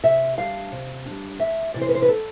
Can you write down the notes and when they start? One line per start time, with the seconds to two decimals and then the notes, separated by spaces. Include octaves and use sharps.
0.04 C3 E5
0.37 G3 D4 F5
0.72 C3
1.06 G3 D4
1.39 D2 E5
1.74 C3 E3 D5
1.81 C5
1.89 B4
1.95 C5
2.02 B4
2.09 A4